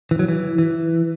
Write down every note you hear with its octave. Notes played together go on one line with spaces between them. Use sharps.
E3
F#3
E3
E3